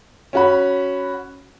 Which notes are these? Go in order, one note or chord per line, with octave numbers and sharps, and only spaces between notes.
C#4 F#4 B5